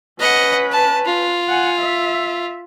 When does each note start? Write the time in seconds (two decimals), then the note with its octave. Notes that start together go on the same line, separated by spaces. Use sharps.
0.19 C#4 B4 D#5 F#5
0.72 A5
1.06 F4
1.48 F#5 G#5
1.79 E5